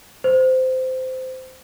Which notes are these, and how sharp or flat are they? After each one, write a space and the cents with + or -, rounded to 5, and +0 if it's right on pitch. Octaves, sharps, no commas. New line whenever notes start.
C5 -20